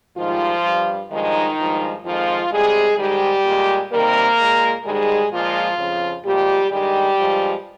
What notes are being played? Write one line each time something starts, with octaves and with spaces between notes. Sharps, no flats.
G#2 D#3 F3 G3 F4
G2 G3
G2 D#3 F3 G#3 D#4
G2 F3 G#3
F2 D#3 F3 G#3 F4
C3 G3 G#3 G#4
G#2 D#3 G3 G#3 G4
A#2 G#3
C3 D#3 G3 A#3 A#4
A#2 G#3
G#2 D#3 G3 G#3 G#4
A#2 F3 G#3 F4
F2 C#3 F3
A#2 F3 G3 G#3 G4
G2 D#3 G3 G#3 G4
G2 F3 G#3